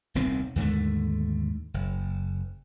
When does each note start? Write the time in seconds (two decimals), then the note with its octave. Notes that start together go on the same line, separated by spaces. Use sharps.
0.15 D#1 C2 D#3 C4
0.56 D#2 G#2 D3 A3
1.74 F#1